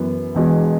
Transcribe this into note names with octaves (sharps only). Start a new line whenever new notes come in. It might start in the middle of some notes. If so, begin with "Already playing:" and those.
Already playing: F#2 E3 B3
E1 E2 B2 G#3